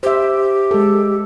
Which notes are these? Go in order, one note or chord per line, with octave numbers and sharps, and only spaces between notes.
G4 C5 E5
G#3 A4